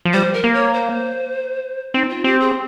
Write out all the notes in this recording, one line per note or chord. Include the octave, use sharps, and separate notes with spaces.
F3
G3 C5
A#4
A#3
C#5
C5
C4 D#4
F4
C4 G4
G#4